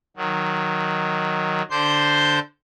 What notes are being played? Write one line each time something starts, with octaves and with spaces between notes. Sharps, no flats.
D#3 F#3
D3 D4 C5 C6 G6